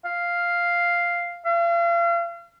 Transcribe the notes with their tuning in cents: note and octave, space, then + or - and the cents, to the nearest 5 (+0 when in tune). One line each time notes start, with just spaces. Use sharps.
F5 +0
F5 -40